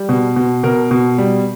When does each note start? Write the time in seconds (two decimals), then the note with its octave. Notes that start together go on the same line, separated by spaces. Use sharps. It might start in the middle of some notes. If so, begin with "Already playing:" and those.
Already playing: G3
0.09 B2
0.36 B2
0.63 B2 A#4
0.91 B2
1.18 G3